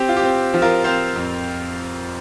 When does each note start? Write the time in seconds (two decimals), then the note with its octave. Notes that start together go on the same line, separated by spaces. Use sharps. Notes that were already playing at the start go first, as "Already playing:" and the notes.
Already playing: C4 G4
0.09 F4
0.17 G4
0.24 C4
0.54 F3
0.62 F4 A#4
0.84 C4 C5 F5
1.16 F2